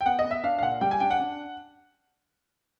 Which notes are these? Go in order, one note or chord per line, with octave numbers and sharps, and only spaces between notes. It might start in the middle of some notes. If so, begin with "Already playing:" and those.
G5
B3 F#5
D#5
B3
E5
D4 F5
F5
A#2 F#5
G3 G5
G#5
D4 G5
F#5
D4